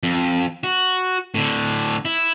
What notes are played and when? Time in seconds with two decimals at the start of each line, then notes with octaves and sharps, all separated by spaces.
0.03 F2
0.64 F#4
1.35 A2 D3
2.05 E4